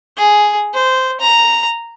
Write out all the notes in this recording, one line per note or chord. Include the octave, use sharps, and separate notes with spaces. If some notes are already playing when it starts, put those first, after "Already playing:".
G#4
C5
A#5